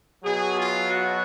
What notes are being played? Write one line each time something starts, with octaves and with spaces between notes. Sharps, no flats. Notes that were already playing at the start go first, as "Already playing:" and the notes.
B2 F#3 G#4
F4
F#4